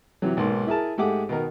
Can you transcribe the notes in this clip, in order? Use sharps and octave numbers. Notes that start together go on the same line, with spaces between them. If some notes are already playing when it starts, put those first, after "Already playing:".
C3 E3 F#3
B1 G#2 A#3 C6
E4 G#4 A#4 A5
G#2 A3 G4 G#4 F#5 D6
B2 D#3 A#4